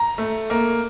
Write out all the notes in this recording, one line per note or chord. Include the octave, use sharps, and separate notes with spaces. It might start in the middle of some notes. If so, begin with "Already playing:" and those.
Already playing: A#5
A3
A#3